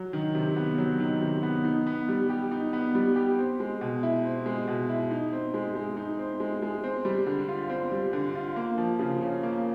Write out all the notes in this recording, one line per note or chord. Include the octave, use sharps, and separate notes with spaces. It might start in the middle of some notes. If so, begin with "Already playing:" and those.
Already playing: F#3
D#3
C3
B3
F#3
D#3
C3
B3
D#4
B3
G3
G4
D#4
B3
G3
G4
C4
G#3
B2
E4
C4
G#3
B2
E4
D#4
C4
G#3
G#3
D#4
C4
G#3
G#3
C4
G3
D3
F4
C4
G3
D3
F4
A#3
F3
C#3
C#4
A#3